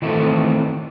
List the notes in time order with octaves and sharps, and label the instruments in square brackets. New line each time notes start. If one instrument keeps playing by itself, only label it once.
[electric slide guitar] D#3 E3 A3 C4 A4